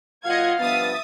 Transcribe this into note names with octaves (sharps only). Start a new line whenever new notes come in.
A#2 F#3 F4 D#5 F5 F#5 G#6
G2 F3 B3 E5 D#6 A6